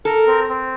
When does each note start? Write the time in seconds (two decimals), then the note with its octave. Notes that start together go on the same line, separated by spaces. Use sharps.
0.05 A4 A#4
0.27 C4
0.49 C4